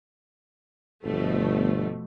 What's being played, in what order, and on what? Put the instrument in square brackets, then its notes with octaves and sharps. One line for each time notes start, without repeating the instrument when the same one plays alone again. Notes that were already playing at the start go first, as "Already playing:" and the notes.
[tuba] G1 [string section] B2 F3 A3